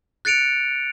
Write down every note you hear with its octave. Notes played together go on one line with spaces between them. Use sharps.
F#6 A6 C#7 D7 F7